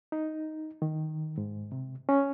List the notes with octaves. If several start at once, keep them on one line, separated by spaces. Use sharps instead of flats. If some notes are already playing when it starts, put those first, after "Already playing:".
D#4
D#3
G#2
C3
C#4